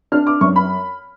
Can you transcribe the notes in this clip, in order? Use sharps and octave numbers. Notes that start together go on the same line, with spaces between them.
D4 F6
D6
F#2 C#6
B5